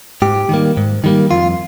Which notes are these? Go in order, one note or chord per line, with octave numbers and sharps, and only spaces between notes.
G#2 G4
D#3 G3 A#3
G#2
D#3 G3 A#3
F2 F4